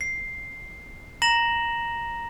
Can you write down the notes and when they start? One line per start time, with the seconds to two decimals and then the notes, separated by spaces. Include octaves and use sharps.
0.01 C7
1.22 A#5 A#6 E7 F#7